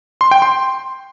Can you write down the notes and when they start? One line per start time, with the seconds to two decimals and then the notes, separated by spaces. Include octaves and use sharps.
0.21 C6
0.31 G5
0.42 C6